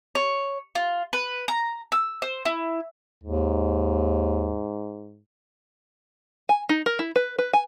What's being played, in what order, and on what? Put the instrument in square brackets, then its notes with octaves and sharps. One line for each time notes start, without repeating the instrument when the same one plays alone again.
[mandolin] C#5
F4
B4
A#5
E6
C5
E4
[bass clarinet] D#2 [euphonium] G#2
[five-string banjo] G#5
D#4
A#4
E4
B4
B4
G#5